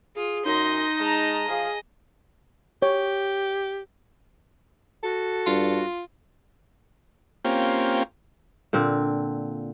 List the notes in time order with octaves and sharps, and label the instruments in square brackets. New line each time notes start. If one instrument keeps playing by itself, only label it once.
[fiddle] F4 [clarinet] G#4
[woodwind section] F#2 [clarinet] D#4 [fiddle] D#5 [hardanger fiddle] C6
[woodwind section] G#3 [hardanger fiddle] A5 A#5
[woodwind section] F3 F5 [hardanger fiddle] G#4
[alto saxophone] G4 [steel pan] C#5
[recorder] F#4 [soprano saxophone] A4
[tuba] G2 [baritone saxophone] F4
[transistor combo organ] A#3 C4 C#4 F4 G4
[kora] A#2 D3 C4